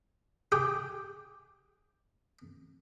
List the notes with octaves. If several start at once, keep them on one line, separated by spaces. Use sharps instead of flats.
G4 G#4 G5 G#5 D6